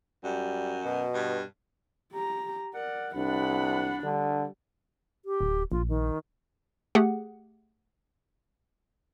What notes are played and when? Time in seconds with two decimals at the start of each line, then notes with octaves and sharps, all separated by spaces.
0.24 F#2 G3
0.85 B2
1.14 G2
2.13 G4 A#5
2.74 A#4 D5 F#5
3.15 C2 D4 F#5 B5
4.03 D3 G3
5.25 G4
5.41 D1
5.72 A#1 F4
5.89 D#3
6.95 A3 G4 G#4 F#5